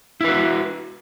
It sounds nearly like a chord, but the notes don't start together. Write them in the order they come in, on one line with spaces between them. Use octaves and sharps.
E4 B4 F#4